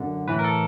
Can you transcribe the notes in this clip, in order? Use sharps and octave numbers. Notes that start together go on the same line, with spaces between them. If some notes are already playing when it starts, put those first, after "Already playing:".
Already playing: F#2 D3
A2 E3 B4
A#4
A4